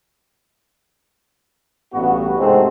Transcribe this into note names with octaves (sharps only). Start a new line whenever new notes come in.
A1 G2 B3 F#4
G#2 C3 G#3 A3 C4